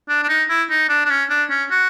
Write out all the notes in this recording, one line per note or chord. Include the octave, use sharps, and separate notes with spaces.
D4
D4
D#4
E4
D#4
D4
D4
C#4
D4
C#4
F#4